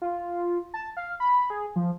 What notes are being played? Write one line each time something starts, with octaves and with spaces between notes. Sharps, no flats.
F4
A5
F5
B5
G#4
F3